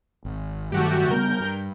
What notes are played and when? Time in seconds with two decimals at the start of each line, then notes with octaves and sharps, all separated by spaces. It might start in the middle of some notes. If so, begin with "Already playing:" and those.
0.25 G#1
0.72 G2 D#3 F#3 A3 F#4 G4
1.09 C#3 G3 B3 A#4 G6
1.40 G2